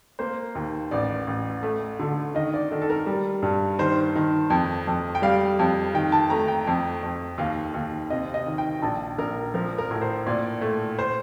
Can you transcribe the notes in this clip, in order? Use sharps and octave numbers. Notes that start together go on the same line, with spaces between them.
A#3 C5
D#2
A1 D5
A1
A3
D3
D#3 D#5
D5
D#3 A4
A4
A#4
G3
G2
D#3 C5
D#3
F2
F2
G5
G3 F5
F2
D#3 G5
A5
A3 A#5
G5
F2
F2
D#2 F5
D#2
C3 D#5
D#5
D#3
G5
A#1 A5
A#1 A#4
F3 A#4
A#4
A2
C5
A#2 D5
A3
C5